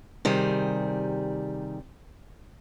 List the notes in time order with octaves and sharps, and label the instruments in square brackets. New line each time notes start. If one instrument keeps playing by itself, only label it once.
[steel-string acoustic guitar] C3 D#3 G3 G#4